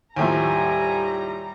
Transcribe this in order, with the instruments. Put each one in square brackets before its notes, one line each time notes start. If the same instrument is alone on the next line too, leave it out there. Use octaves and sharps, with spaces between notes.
[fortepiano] D#2 A2 F3 [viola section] G3 A#5 [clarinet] G#5